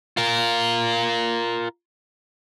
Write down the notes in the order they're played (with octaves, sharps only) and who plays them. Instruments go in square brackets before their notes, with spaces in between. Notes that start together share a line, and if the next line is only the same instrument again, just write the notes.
[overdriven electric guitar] F4 A#4